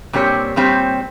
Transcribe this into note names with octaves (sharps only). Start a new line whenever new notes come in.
A#2 G3 C4 G4 C#5
A#2 G3 C4 G4 C#5